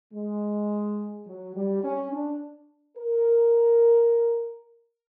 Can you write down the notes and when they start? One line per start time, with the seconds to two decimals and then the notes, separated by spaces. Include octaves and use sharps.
0.13 G#3
1.27 F#3
1.55 G3
1.84 C#4
2.12 D4
2.98 A#4